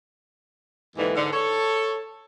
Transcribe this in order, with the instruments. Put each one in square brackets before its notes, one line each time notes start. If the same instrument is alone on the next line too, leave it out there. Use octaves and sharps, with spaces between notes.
[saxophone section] D#2 G#2 D3 E3
G#2 D3
A4 C#5